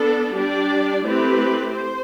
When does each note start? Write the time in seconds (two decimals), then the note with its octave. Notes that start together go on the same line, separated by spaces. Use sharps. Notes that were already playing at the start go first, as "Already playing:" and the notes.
Already playing: B3 D4 A4
0.34 G3 D4 G4 D5
1.04 A3 C4 E4 G4 B4
1.73 C5